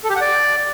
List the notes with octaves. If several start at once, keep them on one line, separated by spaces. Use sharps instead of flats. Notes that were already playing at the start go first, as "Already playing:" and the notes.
A4
G4
F#5
D5